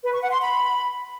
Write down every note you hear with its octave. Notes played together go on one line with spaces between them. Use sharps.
B4
C#6
F#5
C6
B5